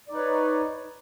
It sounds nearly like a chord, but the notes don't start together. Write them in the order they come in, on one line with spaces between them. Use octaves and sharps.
D5 D#4 B4 C#5